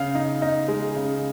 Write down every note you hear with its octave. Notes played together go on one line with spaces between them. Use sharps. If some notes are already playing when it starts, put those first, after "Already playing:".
Already playing: C#3 F5
D#4
D#4
G#3
C#3